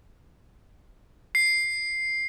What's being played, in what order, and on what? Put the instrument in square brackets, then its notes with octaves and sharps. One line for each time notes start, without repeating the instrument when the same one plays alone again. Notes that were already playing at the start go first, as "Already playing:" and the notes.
[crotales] C7